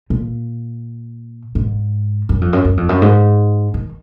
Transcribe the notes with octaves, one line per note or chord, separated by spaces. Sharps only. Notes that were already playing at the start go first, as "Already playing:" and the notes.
A#2
G#2
F#2
F2
F#2
F#2
F2
F#2
G#2
D#3